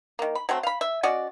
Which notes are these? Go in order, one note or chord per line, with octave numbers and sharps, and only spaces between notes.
D#3 A#3
B5
F#3 A3 C4
F5 B5
E5
C#4 F#4 D5 D#5